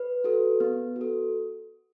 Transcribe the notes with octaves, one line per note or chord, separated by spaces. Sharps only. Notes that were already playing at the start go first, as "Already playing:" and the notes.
Already playing: B4
F#4 A4
B3
F#4
A4